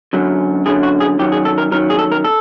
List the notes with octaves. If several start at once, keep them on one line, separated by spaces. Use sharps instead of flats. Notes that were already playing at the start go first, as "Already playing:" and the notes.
F#2 D3 F#3
F#2 D3 F#3 G#4
F#4
G#4
F#2 D#3 F#3 G4
G#4
A4
A#4
F#2 D#3 F#3 A#4
G#4
A4
A#4
A4